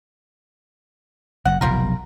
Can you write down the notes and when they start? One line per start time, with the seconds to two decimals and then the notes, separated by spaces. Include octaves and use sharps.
1.45 F#1 F#2 F#5
1.61 F1 B1 B2 G3 F4 A#4